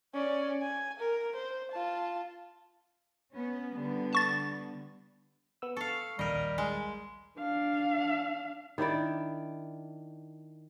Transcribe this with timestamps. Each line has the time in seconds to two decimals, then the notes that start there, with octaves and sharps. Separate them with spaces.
0.14 C#4 D5
0.62 G#5
1.00 A#4
1.35 C5
1.72 F4 A5
3.32 B3 C#4
3.72 D3 G3 B3
4.13 A5 C#6 A6
5.62 B3 E6
5.77 A4 F5 C#6
6.19 A#1 D#2 G3 A#4 D#5
6.58 G#3
7.38 D4 F5
8.78 D#3 D4 E4 D5